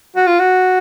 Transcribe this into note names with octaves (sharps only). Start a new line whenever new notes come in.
F#4
F4
F#4